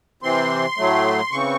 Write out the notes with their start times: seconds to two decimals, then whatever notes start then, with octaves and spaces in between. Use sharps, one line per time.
0.23 C3 E3 C4 C6
0.77 A2 F#3 A3
1.31 C#3 E3 C4 C#6